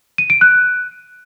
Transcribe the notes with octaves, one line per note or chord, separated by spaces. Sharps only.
D#7
D7
F#6